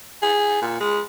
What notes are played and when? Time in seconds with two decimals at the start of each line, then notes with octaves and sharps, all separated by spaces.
0.22 G#4
0.62 A#2
0.80 G#3